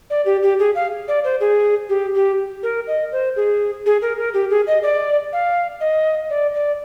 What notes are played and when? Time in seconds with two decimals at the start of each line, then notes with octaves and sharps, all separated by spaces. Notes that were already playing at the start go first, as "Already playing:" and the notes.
0.10 D5
0.26 G4
0.43 G4
0.59 G#4
0.75 F5
1.08 D5
1.24 C5
1.40 G#4
1.89 G4
2.14 G4
2.63 A#4
2.87 D#5
3.12 C5
3.36 G#4
3.86 G#4
4.02 A#4
4.18 A#4
4.34 G4
4.50 G#4
4.67 D#5
4.83 D5
5.33 F5
5.80 D#5
6.30 D5
6.54 D5